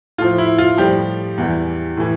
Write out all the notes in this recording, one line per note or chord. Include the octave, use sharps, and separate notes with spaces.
A2 F3 F4
E4
F4
A2 F3 G3 G4
E2 E3 G3
A2 E3